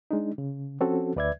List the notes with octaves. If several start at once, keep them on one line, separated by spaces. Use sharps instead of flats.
G#3 D4 D#4
C#3
F3 C4 C#4 F#4 A4
D2 B4 D5 E5 G#6